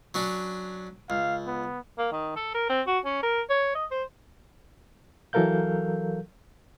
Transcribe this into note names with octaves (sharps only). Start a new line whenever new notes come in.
F#3 C#4 D4
C#2 F5
B3
A#3
D#3
A4
A#4
C4
F#4
C#4
A#4
C#5
D#5
C5
E3 F#3 A4 A#4 F5 G6